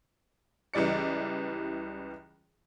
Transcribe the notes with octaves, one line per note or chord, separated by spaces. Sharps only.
C#2 E3 G3 D5 C#7